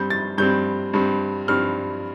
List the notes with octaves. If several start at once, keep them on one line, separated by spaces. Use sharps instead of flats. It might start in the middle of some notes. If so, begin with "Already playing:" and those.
Already playing: G2 G3 C4 G6
A6
G2 G3 C4 G6
G2 G3 C4
G2 G3 C4 F6